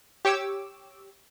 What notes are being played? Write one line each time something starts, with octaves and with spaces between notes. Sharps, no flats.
G4 C#5 D6 E6